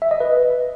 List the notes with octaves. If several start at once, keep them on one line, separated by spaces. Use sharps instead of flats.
E5
D#5
B4